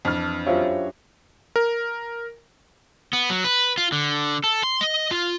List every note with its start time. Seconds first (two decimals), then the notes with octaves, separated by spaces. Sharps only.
0.05 F2 E3 D4 F6
0.47 F#2 F4 G4 C5 C#5 E5 F5
1.56 A#4
3.13 B3
3.30 F#3
3.44 B4
3.78 F4
3.92 D3
4.44 A4
4.63 C6
4.81 D#5
5.11 F4